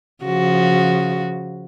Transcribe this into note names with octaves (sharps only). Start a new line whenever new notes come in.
C#3 F3 F#4